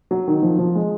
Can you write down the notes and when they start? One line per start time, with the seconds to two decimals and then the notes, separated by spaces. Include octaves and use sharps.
0.11 F#3
0.28 D#3
0.43 F3
0.59 F3
0.75 G#3